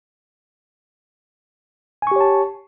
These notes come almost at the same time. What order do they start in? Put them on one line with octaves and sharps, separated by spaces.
G#5 C#6 G4 C#5 A5